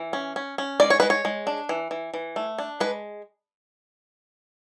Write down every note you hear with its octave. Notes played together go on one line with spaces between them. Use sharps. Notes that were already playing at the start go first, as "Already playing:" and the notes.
Already playing: E3
C#4
C#4
C#4
G#3 D5
C#5
G#3 B4
C#5
G#3
D4
E3
E3
E3
A3
D4
G#3 B4